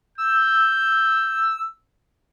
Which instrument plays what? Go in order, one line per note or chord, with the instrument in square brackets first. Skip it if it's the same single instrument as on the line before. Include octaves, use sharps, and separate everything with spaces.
[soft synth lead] E6 [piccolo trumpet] G6